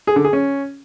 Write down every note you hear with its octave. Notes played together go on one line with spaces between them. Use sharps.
G#4
D3
G#4
C#4